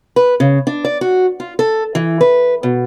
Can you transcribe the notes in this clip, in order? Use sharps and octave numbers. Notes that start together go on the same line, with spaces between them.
B4
C#3
D4
D5
F#4
F4
A4
E3
B4
B2